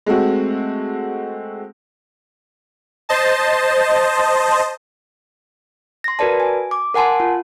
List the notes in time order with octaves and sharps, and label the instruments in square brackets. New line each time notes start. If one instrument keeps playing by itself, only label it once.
[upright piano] G#3 A3 C4 F#4
[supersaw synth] C5 D#5 A5
[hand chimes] C6 A#6
F#4 A#4 B4 D5 A5
G#5
D6
A#4 F#5 G#5 A5 C6
F4